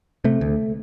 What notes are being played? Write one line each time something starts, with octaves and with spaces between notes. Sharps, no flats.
C3 A3
D2